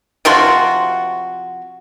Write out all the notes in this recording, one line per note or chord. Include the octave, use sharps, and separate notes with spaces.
C3 F3 F#4 C6